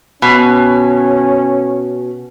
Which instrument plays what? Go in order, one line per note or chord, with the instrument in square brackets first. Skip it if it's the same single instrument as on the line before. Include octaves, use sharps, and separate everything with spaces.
[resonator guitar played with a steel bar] B2 [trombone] C#4